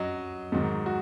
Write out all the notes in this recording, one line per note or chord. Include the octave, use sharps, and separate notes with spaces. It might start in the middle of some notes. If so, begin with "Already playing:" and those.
Already playing: F#2 F#3 D#5
G#2 D#3 F#3
F#4